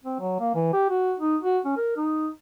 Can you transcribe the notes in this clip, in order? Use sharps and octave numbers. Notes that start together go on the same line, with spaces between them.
C4
F#3
A#3
E3
G4
F#4
D#4
F#4
C#4
A#4
D#4